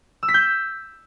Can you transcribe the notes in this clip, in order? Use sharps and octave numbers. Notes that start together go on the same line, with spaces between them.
E6
B6
G6